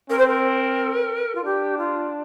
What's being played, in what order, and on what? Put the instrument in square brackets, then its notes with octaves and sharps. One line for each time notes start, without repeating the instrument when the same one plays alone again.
[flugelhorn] C4 [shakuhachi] A#4
[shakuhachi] C5
A#4
F4
[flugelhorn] D4 [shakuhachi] G4
[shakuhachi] F4